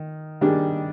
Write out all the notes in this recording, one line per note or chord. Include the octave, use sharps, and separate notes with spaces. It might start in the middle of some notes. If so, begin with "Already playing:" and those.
Already playing: D#3
D#3 G3 D4 G#4